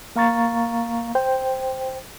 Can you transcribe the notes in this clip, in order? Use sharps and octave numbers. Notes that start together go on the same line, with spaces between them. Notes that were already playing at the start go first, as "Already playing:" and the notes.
A#3 F5 A#5 C#6 A6
C5 G5